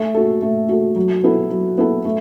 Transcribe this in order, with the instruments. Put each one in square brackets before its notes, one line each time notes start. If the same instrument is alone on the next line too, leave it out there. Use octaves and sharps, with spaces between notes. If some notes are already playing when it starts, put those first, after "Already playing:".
Already playing: [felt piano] A3
F#4 A4
A3
F#4 A4
F#3
B3 E4 A4
F#3
B3 E4 A4
A3